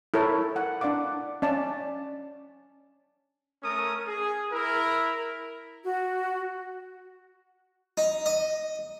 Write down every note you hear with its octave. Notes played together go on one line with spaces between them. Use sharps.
E4 A4 A#4 C#5
F#5
D4 D5 F5 F#5 D6
C#4 D5 A5
A3 C#4 A#4 D#6
G#4
E4 A#4
F#4
D#4
D#5